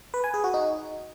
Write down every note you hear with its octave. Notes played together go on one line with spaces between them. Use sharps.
B4
G#5
G#4
F#4
D#4